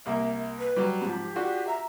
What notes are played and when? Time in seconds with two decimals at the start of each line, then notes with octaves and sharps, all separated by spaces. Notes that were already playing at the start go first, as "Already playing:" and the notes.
0.06 C2 A#3 E5
0.59 B4
0.76 F#3 G3
1.02 G#2 F3 G4
1.36 D4 F4 F#4
1.67 E5 A#5